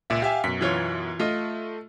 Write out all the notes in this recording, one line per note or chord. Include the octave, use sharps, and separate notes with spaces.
C#2 A#2 E5
G4 E5 F5 G#5
F#2 B2 B6
E3 F4 C#5
A3 F4 D#5